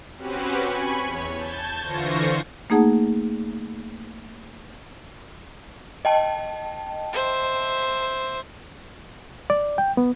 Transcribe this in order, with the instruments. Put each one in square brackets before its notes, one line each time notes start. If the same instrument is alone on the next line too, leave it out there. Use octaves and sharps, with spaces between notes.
[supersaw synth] C4 C#4 F#4 G4 B4
G#5 B5 C#6
E2 C#5
A5 G6 G#6
D3 E3 F4 C5 C#6 A#6
[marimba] A3 A#3 D#4 G#4 F#5 A5
[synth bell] D#5 G5 A5
[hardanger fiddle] C5 E5
[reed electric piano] D5
G5
B3